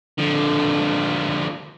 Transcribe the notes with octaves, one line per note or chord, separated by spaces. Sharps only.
D3 F3